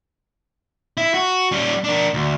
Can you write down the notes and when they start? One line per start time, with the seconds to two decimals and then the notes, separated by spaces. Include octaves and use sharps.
0.97 E4
1.14 F#4
1.52 G3 C#4
1.84 D4 A#4
2.14 D2